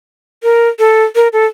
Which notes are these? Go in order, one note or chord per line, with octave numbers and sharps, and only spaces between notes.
A#4
A4
A#4
A4